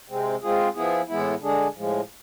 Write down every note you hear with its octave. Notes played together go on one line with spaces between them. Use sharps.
C3 G#3 C4
G#3 C4 F4 G#4
F3 B3 E4 G#4
A2 E3 G#3 B3 E4
D3 G#3 D4 G#4
A2 F3 G#3